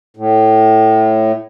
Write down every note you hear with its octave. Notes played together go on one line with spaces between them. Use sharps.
A2